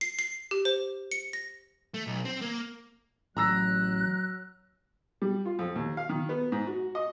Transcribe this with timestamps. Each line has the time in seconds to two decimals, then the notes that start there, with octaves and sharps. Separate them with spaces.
0.01 C7
0.19 C7
0.51 G4
0.65 C5
1.11 C#7
1.33 A#6
1.94 A3
2.07 B1
2.25 C4
2.41 A#3
3.37 A1 F#3 A#5 E6 F#6 A#6
5.22 G3
5.45 F4
5.59 F2
5.76 D#2
5.97 F5
6.09 D#3
6.29 B3
6.52 G#2
6.67 F#4
6.95 D#5